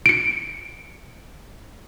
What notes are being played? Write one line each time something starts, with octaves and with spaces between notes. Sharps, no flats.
C#7 D7